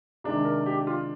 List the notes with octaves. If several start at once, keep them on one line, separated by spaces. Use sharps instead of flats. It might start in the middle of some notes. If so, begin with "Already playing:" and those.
C3 D#3 G#3 D4
A#4
G4
G4
F4